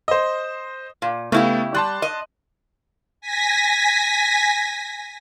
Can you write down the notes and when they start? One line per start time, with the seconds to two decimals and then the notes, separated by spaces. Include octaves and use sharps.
0.08 C5 D#5
1.02 A#2
1.32 C#3 A3 B3 E4 G4
1.75 G3 A5 C6 F#6
2.02 D#5
3.21 G#5 A#6 B6